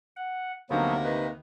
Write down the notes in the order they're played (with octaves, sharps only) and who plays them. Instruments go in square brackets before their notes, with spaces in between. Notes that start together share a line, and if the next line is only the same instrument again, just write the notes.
[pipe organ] F#5
[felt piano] D2 D#4 [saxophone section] C3 A#3 [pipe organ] F3 F#3 B3
[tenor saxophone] D#3 [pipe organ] B4